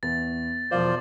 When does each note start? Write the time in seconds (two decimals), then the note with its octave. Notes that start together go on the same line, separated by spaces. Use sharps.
0.03 E2 A6
0.71 E1 F3 F4 C5 D5 F5